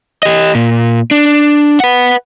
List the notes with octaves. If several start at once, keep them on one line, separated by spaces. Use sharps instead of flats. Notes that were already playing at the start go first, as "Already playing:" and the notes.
G4 D#5
A#2
D4
B4 F#5